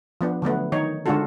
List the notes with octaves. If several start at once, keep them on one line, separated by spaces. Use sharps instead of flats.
F3 B3 D4
D3 F#3 A3 B3
D#3 D#4 C#5
D3 G#3 D4 F4 F#4 A4